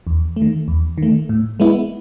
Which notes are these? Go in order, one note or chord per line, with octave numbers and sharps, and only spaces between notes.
E2
A3
D#3
E2
D#3 A3
A2
G#3 B3 E4